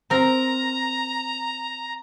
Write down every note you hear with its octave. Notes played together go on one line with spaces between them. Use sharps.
C4 A#4 A#5